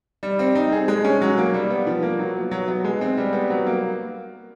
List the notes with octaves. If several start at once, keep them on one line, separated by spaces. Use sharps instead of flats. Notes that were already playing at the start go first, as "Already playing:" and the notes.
G3
C4
D#4
G#4
G#3
C#4
F#3
A#3
G3
B3
F3
A#3
F#3
B3
F#3
B3
G#3
C4
G3
B3
F#3
A#3